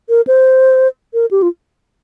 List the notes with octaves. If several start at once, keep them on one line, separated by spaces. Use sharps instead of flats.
A#4
C5
A#4
G4
F4